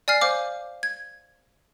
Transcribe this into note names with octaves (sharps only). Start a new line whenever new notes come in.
D5 G#5 F6 C7
C5 F5 D6
G#6